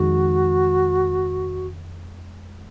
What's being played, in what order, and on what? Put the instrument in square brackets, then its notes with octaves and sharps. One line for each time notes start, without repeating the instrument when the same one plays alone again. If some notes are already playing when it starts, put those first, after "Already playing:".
Already playing: [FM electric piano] F2 D#3 G#3 [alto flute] F#4